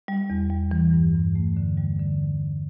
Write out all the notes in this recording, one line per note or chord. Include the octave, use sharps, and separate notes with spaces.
G3
E2
G3
E3
G2
G2
A3
D3
G3
D3